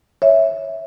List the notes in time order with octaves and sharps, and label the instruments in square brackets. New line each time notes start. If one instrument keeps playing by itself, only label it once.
[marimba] C#5 E5